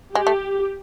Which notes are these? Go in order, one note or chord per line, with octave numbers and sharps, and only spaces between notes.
G#3 G4
A3